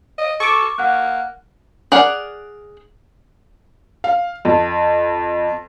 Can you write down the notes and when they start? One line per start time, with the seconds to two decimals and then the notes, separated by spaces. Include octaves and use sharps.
0.18 D#5
0.40 A4 C#6 D6
0.78 A#3 F#5 F#6
1.92 G#4 A#4 D5 F#5
4.04 F5
4.45 F2